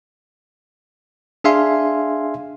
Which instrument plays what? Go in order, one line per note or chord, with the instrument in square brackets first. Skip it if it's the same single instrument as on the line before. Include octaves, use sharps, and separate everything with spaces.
[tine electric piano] D4 G#4 E5 F5 G#5 C6